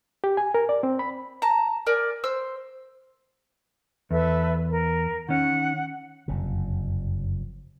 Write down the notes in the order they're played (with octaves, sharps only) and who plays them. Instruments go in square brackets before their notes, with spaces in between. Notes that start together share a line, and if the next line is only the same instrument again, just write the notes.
[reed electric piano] G4
G#5
A#4
D5
C4
B5
[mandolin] A5 A#5
A#4 D5 G#5
C5 E6
[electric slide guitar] E2 [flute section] A4 B4 E5
[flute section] A#4
[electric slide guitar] D#3 C#4 [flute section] F#5
[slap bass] F#1 F2 C3